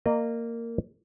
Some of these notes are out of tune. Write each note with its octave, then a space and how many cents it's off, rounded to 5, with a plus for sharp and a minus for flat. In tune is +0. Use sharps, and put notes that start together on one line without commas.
A#3 -15 D#5 -35